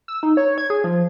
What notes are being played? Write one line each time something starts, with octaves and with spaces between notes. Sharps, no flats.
E6
D#4
C#5
G#6
G#4
F3